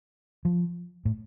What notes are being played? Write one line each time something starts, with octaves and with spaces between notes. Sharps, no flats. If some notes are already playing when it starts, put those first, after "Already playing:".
F3
A2